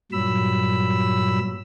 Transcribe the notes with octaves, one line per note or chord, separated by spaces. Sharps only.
G2 A#2 F#3 B5 E6